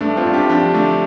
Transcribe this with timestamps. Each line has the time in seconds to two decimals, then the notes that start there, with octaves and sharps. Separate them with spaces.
0.01 G2 A3 D4
0.17 C4 F4
0.25 G2
0.34 D4 G4
0.50 F3 D4 G4
0.74 D3 A3 D4